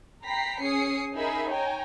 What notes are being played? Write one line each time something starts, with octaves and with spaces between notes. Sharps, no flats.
G5 A#5 B5 B6 C7
C#4 G#4 D#6 C7 C#7
D#4 G#4 A#4 E5 B5
C#5 G5 G#5 A#5